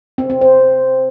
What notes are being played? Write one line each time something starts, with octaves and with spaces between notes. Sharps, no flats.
C4
C4
C5